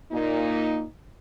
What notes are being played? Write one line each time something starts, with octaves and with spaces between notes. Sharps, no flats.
A#2 A#3 D#4